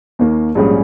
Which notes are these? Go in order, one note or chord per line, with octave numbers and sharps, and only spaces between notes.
D#2 D#3 A#3
A#1 G#2 G3 C#4 G#4